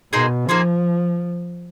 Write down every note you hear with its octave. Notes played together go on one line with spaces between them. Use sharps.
B2 A#3 D#4 G#4 C5
F3 A#3 D#4 G#4 C5